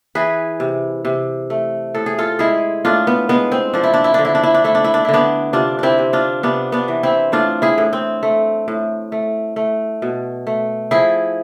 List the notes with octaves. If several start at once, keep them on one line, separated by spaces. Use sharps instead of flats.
E3 G#4 B4
C3
C3
A3
A2 A4
G#4
F4 A4
G#3 E4 G#4
A2 D4 F4
B3
G#3 B3
C4
F3 D4
E4
D4
E4
D3 D4
E4
D4
E4
D4
A3 E4
D4
E4
D4
D3 E4
B3 D4
C3 D4 F4
C4 D4 E4
C3
D4 F4
C3 B3 D4
B3 D4
E3
C4 E4
A2 D4 F4
E4 G#4
A2
C4
A3
A2
A3
A3
B2
A3
F3 E4 G#4